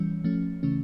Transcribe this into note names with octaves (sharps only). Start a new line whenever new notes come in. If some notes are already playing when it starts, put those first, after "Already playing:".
Already playing: E3 G3 C#4
F3 A3 C#4
C#3 E3 A3 C#4